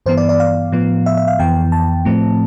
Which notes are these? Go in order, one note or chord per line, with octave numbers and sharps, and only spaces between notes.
G2 E3 B3 C5
D5
D5
F5
A2 F3 B3
E5
E5
F5
F2 E3 B3 G5
A5
A2 F3 A3 C4